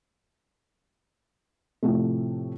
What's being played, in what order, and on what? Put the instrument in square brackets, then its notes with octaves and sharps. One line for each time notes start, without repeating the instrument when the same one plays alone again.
[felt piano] A2 C3 F3 A3